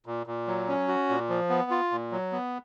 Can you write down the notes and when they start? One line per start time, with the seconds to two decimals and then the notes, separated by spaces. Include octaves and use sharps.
0.06 A#2
0.27 A#2
0.47 F#3
0.68 C#4
0.88 F#4
1.09 A#2
1.29 F3
1.50 B3
1.70 F4
1.91 A#2
2.12 F#3
2.32 B3